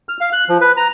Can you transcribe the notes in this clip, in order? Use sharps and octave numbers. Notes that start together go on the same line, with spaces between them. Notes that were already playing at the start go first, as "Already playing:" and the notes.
F6
F5
F#6
F3
B4
A#5